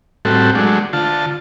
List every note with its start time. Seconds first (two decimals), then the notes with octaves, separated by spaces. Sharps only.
0.25 A2 G3 C4 F#4 A4
0.55 F#3 G#3 A3 D4
0.93 D3 F4 A5